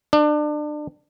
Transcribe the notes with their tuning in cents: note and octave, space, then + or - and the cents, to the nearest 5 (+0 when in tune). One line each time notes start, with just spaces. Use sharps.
D4 +30